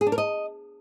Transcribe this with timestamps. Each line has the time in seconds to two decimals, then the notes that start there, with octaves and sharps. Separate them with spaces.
0.01 G#4
0.07 D4
0.12 A#4
0.18 D#5